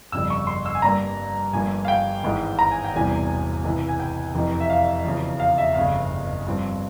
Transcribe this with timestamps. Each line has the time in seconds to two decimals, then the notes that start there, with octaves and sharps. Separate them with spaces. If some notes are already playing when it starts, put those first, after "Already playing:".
0.12 G1 F2 C#3 G3 E6
0.30 C#6
0.47 C6
0.66 E6
0.75 G#5
0.82 G2 G3 A#3 A#5
1.53 G1 G2 F3 A#3 G#5
1.85 F5
1.88 G5
2.23 G#1 G#2 E3 G#3
2.59 A#5
2.71 G#5
2.84 G5
2.94 E1 E2 C3 E3 G3 G#5
3.64 C#2 C3 E3
3.89 G#5
4.00 G5
4.35 F1 F2 E3
4.61 E5
4.70 F5
5.05 E1 E2 C#3 F3
5.40 F5
5.58 E5
5.75 G1 F2 C#3 F5
6.45 G2 F3 C4